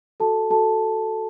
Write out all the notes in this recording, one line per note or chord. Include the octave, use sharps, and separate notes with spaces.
F#4 A4 A5
F#4 A4 A5